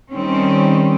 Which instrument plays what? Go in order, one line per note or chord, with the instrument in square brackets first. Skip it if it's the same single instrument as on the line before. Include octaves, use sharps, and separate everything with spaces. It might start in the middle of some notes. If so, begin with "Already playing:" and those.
[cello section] D#3 G3 C4 C#4